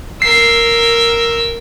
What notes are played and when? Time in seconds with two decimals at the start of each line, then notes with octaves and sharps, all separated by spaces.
0.22 A#4 E6 C7